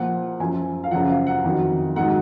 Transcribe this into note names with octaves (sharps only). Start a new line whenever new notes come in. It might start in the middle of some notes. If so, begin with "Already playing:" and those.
Already playing: A#2 F3 F#5
F#2 F3 G#5
F5
F#2 C#3 F3 F#5
F5
F#5
F2 D#3 F#3
G#2 D#3 F#3 F#5